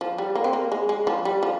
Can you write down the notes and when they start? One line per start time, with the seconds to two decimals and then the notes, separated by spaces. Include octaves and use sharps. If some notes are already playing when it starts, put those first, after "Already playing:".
0.01 F3
0.18 G3
0.35 A#3
0.44 C4
0.53 A#3
0.72 G#3
0.89 G#3
1.07 F3
1.25 G3
1.43 F3